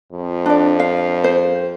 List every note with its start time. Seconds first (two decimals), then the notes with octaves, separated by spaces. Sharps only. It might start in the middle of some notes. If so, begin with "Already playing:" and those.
0.12 F2
0.46 D4 D5
0.80 F5
1.24 C5